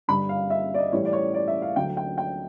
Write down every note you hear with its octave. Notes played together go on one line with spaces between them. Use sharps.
G2 D3 G3 B5
F5
E5
D5
D#5
A2 E3 G3 C#5
D5
C#5
D5
E5
F5
D2 D3 F#3 G5
G5
G5